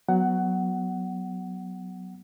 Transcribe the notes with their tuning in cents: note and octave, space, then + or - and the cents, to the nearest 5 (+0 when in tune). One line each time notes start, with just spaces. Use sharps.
F#3 +0 B3 +0 F#5 +15